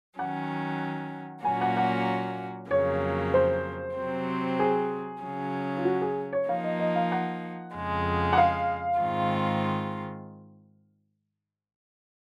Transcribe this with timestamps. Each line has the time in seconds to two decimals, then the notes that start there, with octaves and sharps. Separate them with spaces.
0.19 D#3 F#3 C#4 F#5
1.44 A#2 F#3 A#3 C#4 F#4 G#5
1.61 F#5
1.77 F#5
2.70 F2 C#3 F#3 A#3 C#5
3.34 C5
3.96 C3 F#3 C4
4.59 G#4
5.22 C#3 F#3 C#4
5.77 F4
5.85 F#4
6.02 G#4
6.33 C#5
6.49 F3 A#3 D#4 F5
6.64 D#5
6.80 D#5
6.96 F5
7.12 F#5
7.74 F2 C#3 G#3
8.33 F#5
8.38 F5
9.00 G#2 D#3 G#3 C4 F4